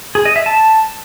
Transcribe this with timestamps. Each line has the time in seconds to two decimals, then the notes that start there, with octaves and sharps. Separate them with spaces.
0.15 G#4
0.25 D#5
0.36 E5
0.46 A5